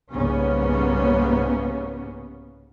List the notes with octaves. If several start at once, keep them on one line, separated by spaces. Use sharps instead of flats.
C2 G#2 C#3 A#3 B3 C#4